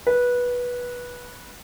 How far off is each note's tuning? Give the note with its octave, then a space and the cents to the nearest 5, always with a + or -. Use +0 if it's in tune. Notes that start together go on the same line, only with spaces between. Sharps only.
B4 -15